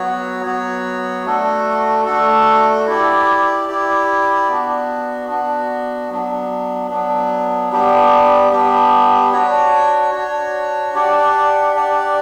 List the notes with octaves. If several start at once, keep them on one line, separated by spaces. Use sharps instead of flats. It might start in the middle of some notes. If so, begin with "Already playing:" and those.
Already playing: F#3 B3 F#4 C#5
F#3 B3 F#4 C#5
A3 D4 F#4 A4
A3 D4 F#4 A4
E4 G4 D5
E4 G4 D5
B3 D4 F#4
B3 D4 F#4
F#3 B3 D4
F#3 B3 D4
G3 B3 D4 G4
G3 B3 D4 G4
D4 F#4 C#5
D4 F#4 C#5
D4 G4 D5 F#5
D4 G4 D5 F#5